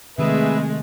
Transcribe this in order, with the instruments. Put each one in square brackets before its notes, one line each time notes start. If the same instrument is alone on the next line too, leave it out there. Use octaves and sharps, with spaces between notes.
[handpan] C3 D#3 [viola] G#3 A3 [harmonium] G#4 B4 E5